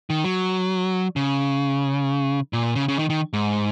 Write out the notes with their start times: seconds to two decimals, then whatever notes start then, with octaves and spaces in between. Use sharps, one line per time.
0.10 D#3
0.24 F#3
1.16 C#3
2.53 A#2
2.76 C#3
2.88 C#3
2.99 D#3
3.10 D#3
3.33 G#2